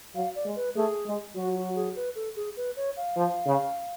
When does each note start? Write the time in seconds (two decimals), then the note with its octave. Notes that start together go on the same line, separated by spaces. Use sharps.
0.15 F#3 F5
0.36 D5
0.45 G#3
0.56 B4
0.75 A3 G#4
1.06 G#3
1.35 F#3 F#4
1.55 F#4
1.76 G#4
1.96 B4
2.15 A4
2.36 G#4
2.57 B4
2.76 C#5
2.97 F5
3.16 F3
3.47 C#3